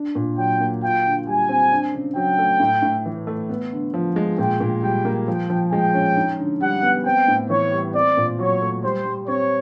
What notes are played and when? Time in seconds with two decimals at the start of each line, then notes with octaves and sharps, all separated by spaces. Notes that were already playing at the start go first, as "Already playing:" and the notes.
Already playing: D4
0.15 A#2
0.37 F#3 G5
0.60 A#3
0.82 F4 G5
1.05 D3
1.27 G3 G#5
1.49 C4
1.72 D4
1.94 C#3
2.16 F#3 G5
2.39 A3
2.60 A2
2.82 A2
3.06 E3
3.27 A3
3.49 B3
3.72 D3
3.94 F3
4.16 G#3
4.38 A#2 G5
4.60 A#2
4.83 G3 G5
5.05 A#3
5.28 F3 G5
5.50 F3
5.71 G#3 G5
5.94 C#4
6.16 D#4
6.38 D3
6.61 G3 F#5
6.83 B3
7.05 C4 G5
7.28 A2
7.50 E3 C#5
7.72 G3
7.94 C4 D5
8.17 A#2
8.39 F#3 C#5
8.62 A3
8.83 G3 C5
9.06 G3
9.27 C4 C#5